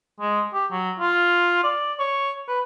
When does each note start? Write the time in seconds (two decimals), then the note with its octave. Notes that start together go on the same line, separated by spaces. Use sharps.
0.20 G#3
0.54 G4
0.71 F#3
0.99 F4
1.64 D5
1.99 C#5
2.48 B4